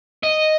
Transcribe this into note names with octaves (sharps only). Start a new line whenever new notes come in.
D#5